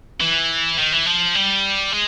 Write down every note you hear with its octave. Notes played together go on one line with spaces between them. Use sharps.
E3
D#3
E3
F3
G3
G#3